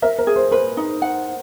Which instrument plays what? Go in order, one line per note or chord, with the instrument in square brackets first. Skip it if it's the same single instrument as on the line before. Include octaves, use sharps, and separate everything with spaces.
[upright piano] A#4 [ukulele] E5
[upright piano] A#4
[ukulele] G#4
[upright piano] C5
[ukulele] B4 [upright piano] C5
[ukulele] D#4
F#5